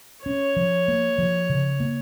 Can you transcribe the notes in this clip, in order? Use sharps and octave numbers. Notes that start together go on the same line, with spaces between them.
C#4 C#5
F3
A#3
F3
C#3
A#3